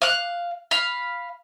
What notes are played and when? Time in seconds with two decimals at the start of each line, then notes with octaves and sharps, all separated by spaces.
0.02 F5 F#6
0.71 F5 B5